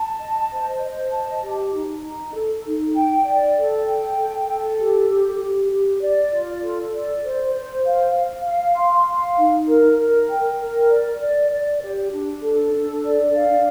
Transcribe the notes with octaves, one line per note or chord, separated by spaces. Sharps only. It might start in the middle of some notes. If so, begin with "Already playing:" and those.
Already playing: A5
D#5
C5
D#5
A5
G4
D#4
D#4
A4
D#4
G5
D5
A4
G5
A4
A4
G4
G4
G4
G4
D5
F4
A4
D5
C5
C5
F5
F5
F5
C6
F5
D#4
A#4
A#4
G5
A#4
D5
D5
D5
G4
D4
A4
D4
D5
F5